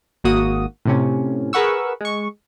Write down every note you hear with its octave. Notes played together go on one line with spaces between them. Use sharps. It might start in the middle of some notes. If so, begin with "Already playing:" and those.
G#1 A#3 F#4 D#6
A2 C3 C#4
G#4 A#4 B4 F#5 C#6 E6
G#3 C#6